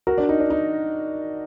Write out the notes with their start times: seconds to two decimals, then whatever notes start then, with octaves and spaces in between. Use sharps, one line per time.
0.07 F#4 A#4
0.18 D4
0.29 D#4
0.40 D4
0.50 D#4